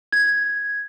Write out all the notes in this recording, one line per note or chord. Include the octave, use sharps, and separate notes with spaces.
G#6